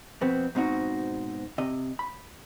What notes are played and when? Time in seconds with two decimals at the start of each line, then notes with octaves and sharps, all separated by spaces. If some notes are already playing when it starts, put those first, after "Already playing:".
0.21 F2 B2 B3 C4
0.55 G#2 B2 C4 D#4 F#4
1.58 C3 D#5
1.99 B5